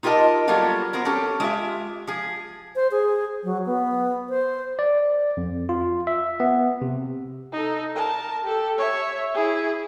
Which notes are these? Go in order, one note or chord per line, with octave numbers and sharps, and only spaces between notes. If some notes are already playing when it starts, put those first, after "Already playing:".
D#4 F4 G4 A#4 D#5 A5
F#3 G3 A#3 B3 F4 A4
B3 C4 F#4 A#4
C#4 G4 A4
G#3 F4 G4 E5
F3 G#4
C5
G#4
F#3
B3
C5
D5
F2
F4
E5
B3
C3
D#4 A4
A#4 A5
G4 A4
C#5 E5
E4 G#4